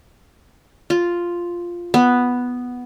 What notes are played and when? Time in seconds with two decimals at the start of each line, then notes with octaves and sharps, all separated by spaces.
0.90 F4
1.94 B3